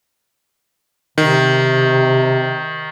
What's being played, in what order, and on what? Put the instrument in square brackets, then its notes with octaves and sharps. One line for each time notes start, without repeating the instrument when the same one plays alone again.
[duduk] C3 [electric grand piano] D#3